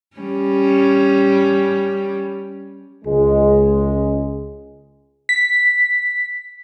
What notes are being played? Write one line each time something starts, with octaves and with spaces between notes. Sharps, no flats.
G3 C#4
C#2 G#3
B6